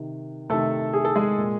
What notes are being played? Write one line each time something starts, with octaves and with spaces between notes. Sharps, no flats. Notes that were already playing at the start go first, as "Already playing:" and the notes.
Already playing: C3 D#3
C3 D#3 A3 A4
G#4
A4
G#3 G#4
A#2